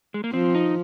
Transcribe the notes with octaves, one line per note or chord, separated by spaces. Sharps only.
G#3
A#3
F3 C4
D#4